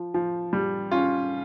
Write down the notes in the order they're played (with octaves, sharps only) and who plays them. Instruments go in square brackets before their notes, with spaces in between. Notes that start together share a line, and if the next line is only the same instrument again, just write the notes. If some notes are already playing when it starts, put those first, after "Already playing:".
Already playing: [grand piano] F3
F3
G3
C#4 F4